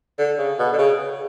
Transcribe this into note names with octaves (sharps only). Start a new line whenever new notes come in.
D3
C#3
B2
D3
C#3